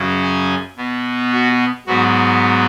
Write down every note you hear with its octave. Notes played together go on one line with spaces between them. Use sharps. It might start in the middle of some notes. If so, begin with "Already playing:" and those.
Already playing: F#2 C#3 F#3 C#4
G#5
B2 B3
F#4
G#2 F#3 B3 F#4